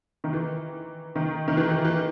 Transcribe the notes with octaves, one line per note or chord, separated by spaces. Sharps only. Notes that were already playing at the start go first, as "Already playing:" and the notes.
D#3
E3
D#3
D#3
E3
E3
E3